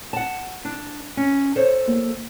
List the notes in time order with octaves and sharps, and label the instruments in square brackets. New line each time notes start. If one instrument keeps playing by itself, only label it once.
[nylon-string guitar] F#5 A5
D4
C#4
A4 C5 C#5
[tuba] A#3